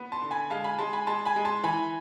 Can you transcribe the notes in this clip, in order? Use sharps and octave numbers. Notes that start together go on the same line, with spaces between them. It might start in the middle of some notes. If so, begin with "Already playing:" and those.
Already playing: B3
A5 C6
D3
G#5 B5
G#3 F5 A5
G#5 B5
G#3 A5 C6
G#5 B5
G#3 A5 C6
G#5 B5
G#3
A5 C6
E3 G#5 B5